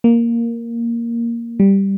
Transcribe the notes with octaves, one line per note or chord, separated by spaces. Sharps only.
A#3
G3